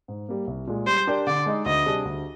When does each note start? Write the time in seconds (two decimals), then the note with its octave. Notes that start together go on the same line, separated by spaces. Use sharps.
0.08 G#2
0.29 G3 A#3
0.47 C2
0.67 A#2 G#3
0.87 G3 C5
1.07 D4 G4 A#4 D5
1.27 D3 D5
1.46 G#3 D#4
1.66 D2 D#5
1.86 C3 G3 D4 G#4
2.05 D2